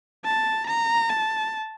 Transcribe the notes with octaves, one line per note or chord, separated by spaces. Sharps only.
A5
A#5
A5